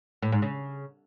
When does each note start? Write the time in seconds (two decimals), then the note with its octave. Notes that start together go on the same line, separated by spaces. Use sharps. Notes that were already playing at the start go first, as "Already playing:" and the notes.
0.22 A2
0.32 G#2
0.42 C#3